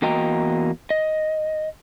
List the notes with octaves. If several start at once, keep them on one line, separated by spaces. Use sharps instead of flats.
E2 A#3 F#4 D#5 G5 A#5
D#5